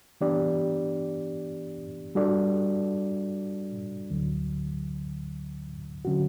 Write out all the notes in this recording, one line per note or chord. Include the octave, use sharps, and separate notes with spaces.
E3 B3 D4 G4 D5
G3 D4 F#4 A4 D5
D2 D3 F#3
D3 F#3 C#4 F#4